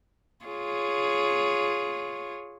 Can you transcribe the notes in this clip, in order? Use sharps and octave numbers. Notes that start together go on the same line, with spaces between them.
F4 G#4 C#5